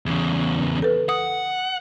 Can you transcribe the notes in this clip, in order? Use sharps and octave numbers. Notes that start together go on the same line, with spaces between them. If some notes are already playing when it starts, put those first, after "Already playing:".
E2 C#3
A4 B4
F#5 D#6